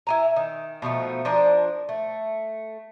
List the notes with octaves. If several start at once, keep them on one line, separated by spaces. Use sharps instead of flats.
E4 G#5 A#5
D#3
B2 F3 A3 D#4
F3 D4 A#4
A3